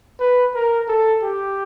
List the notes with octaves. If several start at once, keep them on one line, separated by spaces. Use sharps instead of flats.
B4
A#4
A4
G4